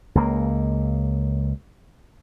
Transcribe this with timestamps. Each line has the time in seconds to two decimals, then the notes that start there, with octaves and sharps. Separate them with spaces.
0.15 C#2 A#3